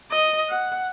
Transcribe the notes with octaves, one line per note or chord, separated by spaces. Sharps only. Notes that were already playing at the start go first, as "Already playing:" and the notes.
D#5
F#5